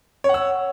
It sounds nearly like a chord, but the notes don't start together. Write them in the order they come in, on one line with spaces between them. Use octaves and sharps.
C#5 F#5 E6